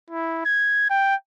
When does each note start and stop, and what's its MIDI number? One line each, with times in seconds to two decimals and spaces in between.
0.10 0.44 64
0.45 0.88 92
0.90 1.15 79